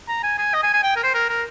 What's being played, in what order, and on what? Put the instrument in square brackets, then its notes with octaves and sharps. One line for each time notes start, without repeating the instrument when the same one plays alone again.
[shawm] A#5
G#5
G#5
D#5
G#5
G#5
G5
A#4
C5
A#4
A#4